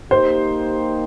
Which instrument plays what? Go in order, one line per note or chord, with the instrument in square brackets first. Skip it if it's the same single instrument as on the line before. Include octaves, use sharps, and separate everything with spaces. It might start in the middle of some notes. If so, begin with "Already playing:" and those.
[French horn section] A#3 D#4 G4 [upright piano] C5